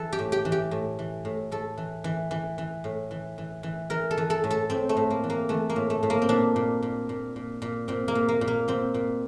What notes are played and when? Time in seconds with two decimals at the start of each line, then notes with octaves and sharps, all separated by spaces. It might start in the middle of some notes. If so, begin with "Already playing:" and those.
Already playing: E3 A4
0.13 G4
0.19 A2
0.32 G4
0.45 E3
0.52 G4
0.71 A2
0.99 E3
1.25 A2
1.51 A2 A4
1.78 E3
2.04 E3
2.31 E3
2.58 E3
2.84 A2
3.11 E3
3.38 E3
3.63 E3
3.90 E3 A#4
4.11 A4
4.18 E3
4.30 A4
4.44 A2
4.50 A4
4.70 A2 C4
4.89 A3
4.97 A2
5.10 A#3
5.24 E3
5.30 A#3
5.49 E3 A3
5.70 A#3
5.76 A2
5.90 A3
6.03 A2
6.10 A#3
6.22 C4
6.29 A#2 D4
6.56 A#2
6.83 A#2
7.09 A#2
7.36 A#2
7.62 A#2
7.88 A#2 C4
8.08 A#3
8.15 A#2
8.28 A#3
8.41 A#2
8.48 A#3
8.68 A#2 C4
8.94 A#2